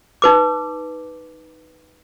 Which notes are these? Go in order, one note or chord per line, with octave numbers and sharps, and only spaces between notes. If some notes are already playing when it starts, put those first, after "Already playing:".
D#4 B4 D6